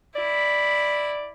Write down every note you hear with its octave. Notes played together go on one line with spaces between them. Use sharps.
E4 D5 B5